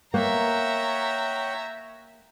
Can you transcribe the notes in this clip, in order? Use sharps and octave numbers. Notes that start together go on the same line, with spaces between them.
A#3 C#5 E5 F#5 G5 A#5